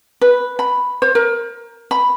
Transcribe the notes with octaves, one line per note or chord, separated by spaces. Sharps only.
B4
B5
C5
A#4
B5